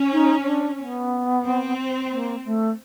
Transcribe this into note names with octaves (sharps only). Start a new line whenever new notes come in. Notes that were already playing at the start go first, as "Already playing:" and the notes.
Already playing: C#4
D#4
D4
B3
C4
A#3
A3